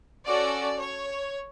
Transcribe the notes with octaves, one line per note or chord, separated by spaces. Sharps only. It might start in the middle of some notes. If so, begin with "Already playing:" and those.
C#4 F#4 A4 D5
C#5